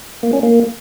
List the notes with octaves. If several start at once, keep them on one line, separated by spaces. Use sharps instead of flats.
A#3
C#4
A#3